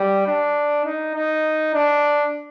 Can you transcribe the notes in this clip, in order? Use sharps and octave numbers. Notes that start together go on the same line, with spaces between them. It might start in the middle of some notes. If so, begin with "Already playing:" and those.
Already playing: G3
D4
D#4
D#4
D4